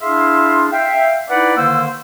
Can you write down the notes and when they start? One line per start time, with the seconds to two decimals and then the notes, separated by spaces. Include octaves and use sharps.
0.01 D4 E4 G#4 E5 F5 C6
0.72 E5 F5 G5
1.29 D#4 E4 B4 D5 F#5
1.57 D3 D#3 A#3 C5 E6